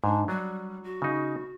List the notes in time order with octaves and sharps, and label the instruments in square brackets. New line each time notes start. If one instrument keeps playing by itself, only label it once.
[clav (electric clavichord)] G#2 [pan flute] D4
[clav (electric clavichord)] F#3 D4 [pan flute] G3
[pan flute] F#4
[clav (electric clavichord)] C#3 D#4